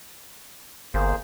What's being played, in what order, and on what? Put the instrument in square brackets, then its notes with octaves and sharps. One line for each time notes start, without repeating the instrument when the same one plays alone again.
[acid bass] G1 [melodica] A#3 G#4 C5